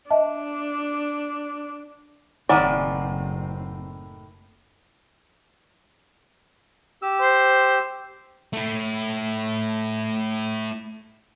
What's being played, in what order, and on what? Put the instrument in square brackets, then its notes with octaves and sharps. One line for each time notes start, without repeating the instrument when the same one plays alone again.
[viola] D4 [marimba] D#5 E5 A5
[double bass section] F#1 C4 [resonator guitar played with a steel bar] A2 D#3 G#5 [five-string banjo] D5 [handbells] F#5
[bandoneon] G4 E6
[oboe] C5
[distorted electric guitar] A3 E4